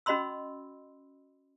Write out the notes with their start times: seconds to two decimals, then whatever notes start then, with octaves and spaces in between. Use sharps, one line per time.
0.06 C#4 F#4 D#5 B5 C6 E6